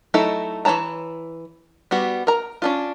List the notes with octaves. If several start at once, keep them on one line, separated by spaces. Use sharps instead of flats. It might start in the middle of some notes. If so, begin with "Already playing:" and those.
F#3 A3 D#4 E4 A4
E3 D4 C#5 A5 A#5
G3 B3 F#4
A#4 A#5
C#4 D4 F4